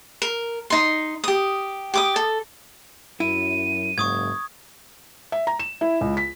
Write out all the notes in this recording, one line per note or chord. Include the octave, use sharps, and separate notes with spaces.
A#4
D#4 C6
G4 D#6
G4 D6 D#6
A4
F#2 E4 D#7
F#1 G#2 C#6 D#6 G#6
E5
A#5
E7
E4
C#2
B6